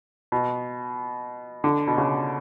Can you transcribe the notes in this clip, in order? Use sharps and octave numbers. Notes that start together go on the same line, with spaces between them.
B2
D3
B2
C#3